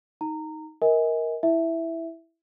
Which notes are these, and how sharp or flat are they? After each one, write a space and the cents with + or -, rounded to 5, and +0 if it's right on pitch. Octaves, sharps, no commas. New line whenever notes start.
D#4 +15 A#5 -20
A#4 +5 D#5 +40 G#5 -10
E4 +0 E5 +0